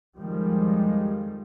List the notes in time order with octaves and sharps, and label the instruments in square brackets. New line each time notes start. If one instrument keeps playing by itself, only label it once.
[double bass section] F2 D#3 F3 G3 G#3